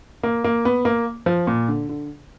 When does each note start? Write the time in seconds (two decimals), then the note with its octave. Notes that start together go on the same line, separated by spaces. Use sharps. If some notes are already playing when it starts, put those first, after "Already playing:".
0.23 A#3
0.44 A#3
0.65 B3
0.85 A#3
1.26 F3
1.47 A#2
1.68 D3
1.89 D3